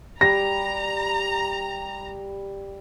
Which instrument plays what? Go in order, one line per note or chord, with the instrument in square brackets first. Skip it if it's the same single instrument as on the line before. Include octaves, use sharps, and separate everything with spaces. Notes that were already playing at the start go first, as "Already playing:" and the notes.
[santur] G3 [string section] A#5 [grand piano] A#6